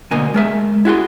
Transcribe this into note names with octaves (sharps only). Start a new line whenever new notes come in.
D2 B2 A#3 G#5
G#3 A#4 E5
E4 F#4 G#4 C6